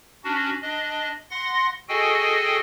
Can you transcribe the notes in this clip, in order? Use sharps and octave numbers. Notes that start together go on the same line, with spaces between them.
C#4 D4 F#4
D4 D#5
F#5 C6 A#6
F#4 G#4 A4 D#5 G5 G#5